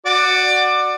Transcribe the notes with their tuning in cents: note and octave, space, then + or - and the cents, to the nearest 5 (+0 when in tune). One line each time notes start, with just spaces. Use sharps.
F#4 +0 D5 +20